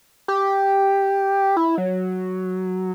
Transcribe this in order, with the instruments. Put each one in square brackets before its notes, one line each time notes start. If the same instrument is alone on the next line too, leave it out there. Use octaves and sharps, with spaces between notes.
[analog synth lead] G4
E4
F#3